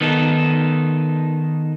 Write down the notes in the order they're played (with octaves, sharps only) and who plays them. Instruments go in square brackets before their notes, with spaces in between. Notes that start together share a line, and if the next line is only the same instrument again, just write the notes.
[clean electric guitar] D#3 B3 D#4 A4